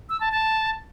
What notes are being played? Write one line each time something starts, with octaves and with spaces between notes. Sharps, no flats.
E6
A5
A5